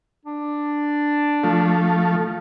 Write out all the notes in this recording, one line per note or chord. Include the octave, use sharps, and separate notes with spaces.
D4
F3 A3